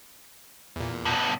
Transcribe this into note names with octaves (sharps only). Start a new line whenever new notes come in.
E2 A#2
G2 B2